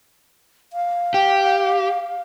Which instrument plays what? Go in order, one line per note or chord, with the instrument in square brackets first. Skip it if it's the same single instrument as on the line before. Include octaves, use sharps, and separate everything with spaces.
[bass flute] F5
[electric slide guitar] G4